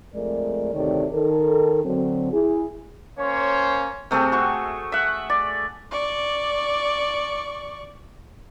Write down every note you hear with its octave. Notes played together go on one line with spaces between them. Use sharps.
F2 G#3 A3 A#4 D5
D2 C3 D#3 A4 C#5 D5
D#3 A4 A#4
D3 F#3 C4
E4 G#4
A#3 C#4 C5 C#5
C3 A3 C4 G#4
F#4 C#6
E5 F#5
D5
D5 C#6